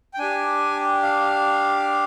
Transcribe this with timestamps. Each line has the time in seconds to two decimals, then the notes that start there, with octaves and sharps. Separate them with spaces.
0.14 G5
0.19 D4 G4 G#5
1.03 F5